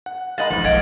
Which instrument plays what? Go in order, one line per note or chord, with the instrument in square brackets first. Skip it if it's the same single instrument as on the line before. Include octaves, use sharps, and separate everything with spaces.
[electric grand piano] F#5
[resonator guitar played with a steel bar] G#3 A#4 D#5 [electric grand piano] F5 F#5 B5 [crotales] A6 F#7
[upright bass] D#2 A3 [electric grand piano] G#2 D3 E3 [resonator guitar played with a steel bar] F3
[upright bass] A#1 F2 [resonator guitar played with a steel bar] D#5 F5 F#5 [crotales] G#6 A6 D7